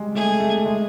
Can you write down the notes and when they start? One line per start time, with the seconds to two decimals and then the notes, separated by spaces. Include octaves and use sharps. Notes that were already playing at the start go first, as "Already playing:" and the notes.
Already playing: G3 G#3
0.15 A3 G#4
0.40 A3
0.66 G#3